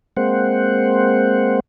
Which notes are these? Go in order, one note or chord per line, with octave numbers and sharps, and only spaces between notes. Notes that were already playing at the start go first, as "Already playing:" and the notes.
G#3 A#3 C4 C5 F#5